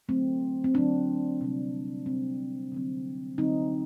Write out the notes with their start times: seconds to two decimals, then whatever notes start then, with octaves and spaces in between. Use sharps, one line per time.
0.08 D3 F#3 A3 C4
0.64 C4
0.74 D3 F#3 A3 C4 D4
1.41 C3 G3 C4
2.06 C3 G3 C4
2.72 D3 F#3 C4
3.38 D3 F#3 C4 D#4